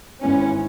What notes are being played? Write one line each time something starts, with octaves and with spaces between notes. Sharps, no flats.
G#1 G#2 E3 B3 C#4